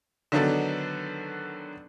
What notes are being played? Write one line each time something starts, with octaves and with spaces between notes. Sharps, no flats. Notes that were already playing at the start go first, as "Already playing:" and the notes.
D3 D#3 F#3 B3 D4 A4